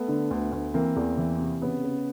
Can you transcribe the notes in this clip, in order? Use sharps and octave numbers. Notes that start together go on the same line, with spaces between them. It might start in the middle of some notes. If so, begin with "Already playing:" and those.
Already playing: A3 B3
D3
D2
D2
E3 A#3 C4
E2
E3
C3
C#3 B3 C#4
C#3